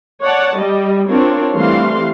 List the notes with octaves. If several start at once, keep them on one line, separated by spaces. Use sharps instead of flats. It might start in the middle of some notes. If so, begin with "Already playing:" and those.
C#5 D5 F#5 A5
G3 G4 D#5
C4 D4 F4 A#4 C#5
E3 G3 A3 C4 F5 C6